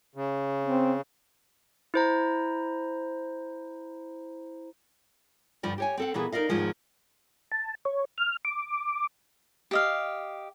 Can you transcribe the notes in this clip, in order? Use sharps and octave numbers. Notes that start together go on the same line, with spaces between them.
C#3
C4
E4 C5 A#5
D2 G2 F3 F4 D5
G4 C#5 G#5
C4 A4 F#5
A#2 E3 B3 G#4
D#4 A#4 D5 D#5 F5
E2 G#2 D#3 F3 G#3
A5
C#5
F6
D6
G4 D#5 F5